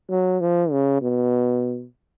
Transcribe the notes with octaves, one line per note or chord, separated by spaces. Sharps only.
F#3
F3
C#3
B2